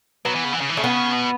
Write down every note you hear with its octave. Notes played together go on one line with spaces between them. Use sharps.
F#3 B3
E3
C#3
E3
C#3
E3
C#3 A3
B3
B2